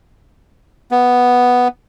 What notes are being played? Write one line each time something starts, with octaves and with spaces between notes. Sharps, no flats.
B3